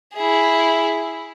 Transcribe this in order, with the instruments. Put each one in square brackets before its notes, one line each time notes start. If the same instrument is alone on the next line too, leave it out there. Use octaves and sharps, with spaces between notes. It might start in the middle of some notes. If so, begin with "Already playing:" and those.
[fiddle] E4 G#4